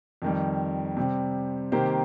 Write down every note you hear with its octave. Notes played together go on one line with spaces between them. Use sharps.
F2 D#3 G3
C3 G3 C4
C3 D#3 A#3 G4 C5